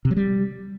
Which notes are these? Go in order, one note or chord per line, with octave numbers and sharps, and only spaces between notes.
C3
F#3
G3